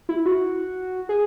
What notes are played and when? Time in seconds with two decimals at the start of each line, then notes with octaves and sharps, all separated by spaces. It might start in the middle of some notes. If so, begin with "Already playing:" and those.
0.09 E4
0.26 F#4
1.09 G#4